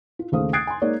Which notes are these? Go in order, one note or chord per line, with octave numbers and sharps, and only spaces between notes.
F4
D#2 C#3 A3 C5 F5 D#6
D#6 F#6 G#6 A6 C7 D7
G#5 C6
G#3 A#3 D#4 C#5 D5